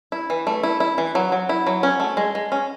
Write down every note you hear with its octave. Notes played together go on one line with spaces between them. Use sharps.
E4
E3
A3
E4
E4
E3
F#3
F#3
E4
F#3
C#4
A3
G#3
G#3
C#4